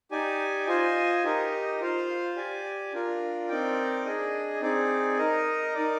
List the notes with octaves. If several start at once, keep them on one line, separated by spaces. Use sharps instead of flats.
D#4 G4 D5 G#5
F4 C5 D#5 G#5
D#4 G4 A#4 D#5
F4 C5 F5
G4 D5 G#5
D4 F4 A#4
C4 D#4 A#4 D5 G5
D4 G#4 D#5
C4 D#4 G#4 D5
D#4 A#4 D#5
D#4 A#4 D5